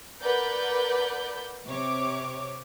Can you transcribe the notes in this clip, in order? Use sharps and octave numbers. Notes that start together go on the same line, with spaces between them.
A#4 B4 D5 F#5 G6
C3 C#5 D6